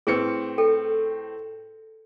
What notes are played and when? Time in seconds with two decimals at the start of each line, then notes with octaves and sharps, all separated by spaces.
0.07 A2 C4 G#4 B4 C#7
0.58 A4 G5